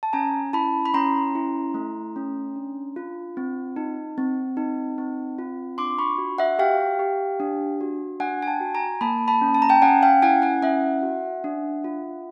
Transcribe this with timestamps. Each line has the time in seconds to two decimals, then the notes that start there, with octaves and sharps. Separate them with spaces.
0.03 A5
0.13 C#4 G#5 A#5
0.53 E4 A5 B5
0.86 B5
0.94 C#4 A#5 C6
1.35 E4
1.74 A3
2.16 C#4
2.56 D4
2.96 F4
3.37 C4
3.76 D#4
4.18 C4
4.57 D#4
4.98 C4
5.38 F4
5.78 D4 C6 D6
5.98 B5 C#6
6.18 F#4
6.38 E5 F#5
6.59 G4 F5 G5
6.99 G4
7.40 D4
7.81 F#4
8.20 D4 F#5 G#5
8.43 G#5
8.47 G5 A5
8.60 F#4
8.75 G#5 A#5
9.01 A#3 A5 B5
9.28 A5 B5
9.41 C#4
9.55 A5
9.62 A#5
9.69 G5 A5
9.82 C#4 F#5 G#5
10.02 F5 G5
10.22 E4 F#5 G#5
10.42 F#5 G#5
10.62 C#4 E5 F#5
11.03 F#4
11.44 D4
11.84 F4